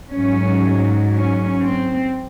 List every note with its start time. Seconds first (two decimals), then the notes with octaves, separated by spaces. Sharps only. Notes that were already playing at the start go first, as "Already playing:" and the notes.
0.13 G#2 F#3 C#4
1.14 C#4
1.64 C4